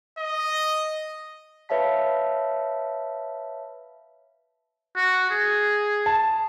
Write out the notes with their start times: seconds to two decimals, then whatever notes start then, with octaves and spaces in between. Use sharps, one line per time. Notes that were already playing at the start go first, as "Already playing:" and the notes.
0.18 D#5
1.69 B4 C#5 E5 F5 A5 B6
4.96 F#4
5.31 G#4
6.06 A5